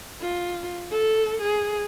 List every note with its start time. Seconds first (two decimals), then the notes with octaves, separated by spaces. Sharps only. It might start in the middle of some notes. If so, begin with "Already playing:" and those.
0.21 F4
0.91 A4
1.41 G#4